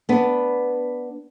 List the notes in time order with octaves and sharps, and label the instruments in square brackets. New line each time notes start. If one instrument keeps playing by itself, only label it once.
[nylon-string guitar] B3 D4